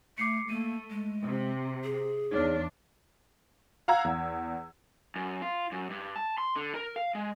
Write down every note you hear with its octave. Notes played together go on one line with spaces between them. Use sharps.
A3 D6 C7 C#7
A3 A#3 D#7
G#3
C3
G#4
E2 D4 D#4 C#5 F6
F5 F#5 A#5 E6 G#6
E2
F#2
F4
F#2
G2
A5
C6
D3
A#4
F5
G#3